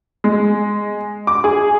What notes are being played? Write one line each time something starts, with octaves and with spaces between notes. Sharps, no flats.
G#3
D6
G#4